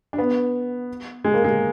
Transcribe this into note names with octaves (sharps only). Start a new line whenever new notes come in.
D4
B3
G#3
A#3
G#3